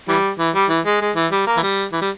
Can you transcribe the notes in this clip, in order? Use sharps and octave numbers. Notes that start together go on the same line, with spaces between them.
E3 G3
E3
G3
E3
G#3
G#3
E3
G3
A#3
E3
G3
E3
G3